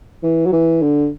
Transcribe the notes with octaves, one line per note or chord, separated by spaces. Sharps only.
E3
F#3
E3
D3